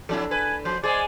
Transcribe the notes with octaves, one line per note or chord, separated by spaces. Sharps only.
F3 F#3 D4 E4 A4
B4 G#5
F3 C5
G#3 G#4 C5 D5